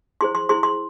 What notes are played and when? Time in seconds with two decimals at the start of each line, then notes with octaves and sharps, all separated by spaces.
0.21 E4 G#4 C5 C6
0.35 C6
0.49 E4 G#4 C5 C6
0.63 C6